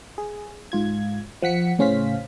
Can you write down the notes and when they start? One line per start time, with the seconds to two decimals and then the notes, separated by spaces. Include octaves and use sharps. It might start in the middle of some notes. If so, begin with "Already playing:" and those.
0.18 G#4
0.72 G#2 F4 G#6
1.42 F3 F#5 B6 C#7
1.79 A2 C#3 C#4 C5 F5 B6